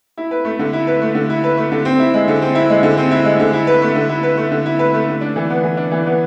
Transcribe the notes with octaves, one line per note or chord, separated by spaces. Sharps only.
E4
B4
A3
D3
E4
B4
A3
D3
E4
B4
A3
D3
C4
E4
G#3
D3
C4
E4
G#3
D3
C4
E4
G#3
D3
E4
B4
A3
D3
E4
B4
A3
D3
E4
B4
A3
D3
D4
E3
B3
E3
D4
E3
B3